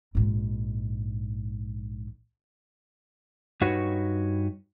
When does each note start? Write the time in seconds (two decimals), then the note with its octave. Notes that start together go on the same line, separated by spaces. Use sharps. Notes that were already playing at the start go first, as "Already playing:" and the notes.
0.15 A#1 G#2
3.61 G2 D#4 F#4 B4 C#5